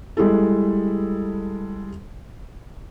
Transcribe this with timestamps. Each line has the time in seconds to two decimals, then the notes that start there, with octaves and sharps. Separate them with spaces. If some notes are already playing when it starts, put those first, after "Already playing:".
0.17 G3 G#3 E4 A4